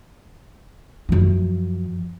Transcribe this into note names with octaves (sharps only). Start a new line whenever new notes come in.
F#2 F3